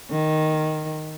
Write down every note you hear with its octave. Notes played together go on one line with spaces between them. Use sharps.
D#3